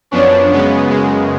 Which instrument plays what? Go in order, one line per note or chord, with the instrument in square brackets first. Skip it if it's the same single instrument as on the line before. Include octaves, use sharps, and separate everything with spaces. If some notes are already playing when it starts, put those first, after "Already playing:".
[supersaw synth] F#2 F3 B3 D4 [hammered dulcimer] C#4
[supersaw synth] F#2 C#3 G#3 B3
[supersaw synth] F#2 C#3 G#3 [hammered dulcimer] B3